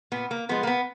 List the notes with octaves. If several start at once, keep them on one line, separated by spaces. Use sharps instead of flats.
A#2 B3
A#3
F3 G#3 B3
A#3
B3